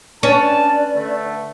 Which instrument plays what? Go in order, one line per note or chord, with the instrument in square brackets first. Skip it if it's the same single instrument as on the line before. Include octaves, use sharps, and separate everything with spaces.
[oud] C#4 [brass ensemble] D4 A5 [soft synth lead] B4 [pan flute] D5
[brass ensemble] D3 A3